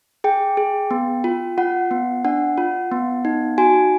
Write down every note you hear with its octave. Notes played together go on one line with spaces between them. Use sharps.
G#4 G5
G#4
B3
F4
F4 F#5
B3
D4 F#5
F4
B3
D#4
F#4 G#5